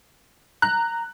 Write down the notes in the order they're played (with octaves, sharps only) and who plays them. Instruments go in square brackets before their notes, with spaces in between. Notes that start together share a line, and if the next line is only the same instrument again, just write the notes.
[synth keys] A#5 [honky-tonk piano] F#6